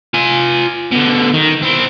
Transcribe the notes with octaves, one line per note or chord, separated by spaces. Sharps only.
F4 G#5
B2 D3
D#3
C4 E4